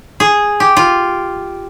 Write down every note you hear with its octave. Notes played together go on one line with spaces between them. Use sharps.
G#4
G4
F4